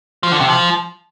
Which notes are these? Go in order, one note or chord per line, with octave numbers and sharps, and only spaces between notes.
F3
D3
C3
F3